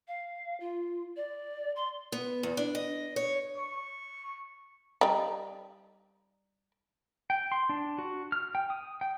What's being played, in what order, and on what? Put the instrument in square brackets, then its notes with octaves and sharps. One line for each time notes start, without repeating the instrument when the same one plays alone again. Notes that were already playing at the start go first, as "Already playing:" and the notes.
[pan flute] F5
F4
D5
C6
[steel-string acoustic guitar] B3
E2
D4
D#5
C#5
[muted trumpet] C#6
[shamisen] G3 D#4
[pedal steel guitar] G5
C6
D4
F#4
F6
G5
D#6
G5